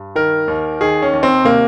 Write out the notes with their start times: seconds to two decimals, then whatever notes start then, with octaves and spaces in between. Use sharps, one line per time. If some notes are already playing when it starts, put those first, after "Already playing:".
Already playing: G2
0.15 D#3 A#4
0.48 D#2
0.81 D#3 G#4
1.02 C#4
1.13 D#2
1.23 C4
1.44 C3 A#3